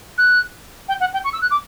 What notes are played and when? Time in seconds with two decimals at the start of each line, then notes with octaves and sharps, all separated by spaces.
0.17 F#6
0.88 G5
1.00 F#5
1.13 G5
1.24 C#6
1.32 E6
1.41 F#6
1.50 D6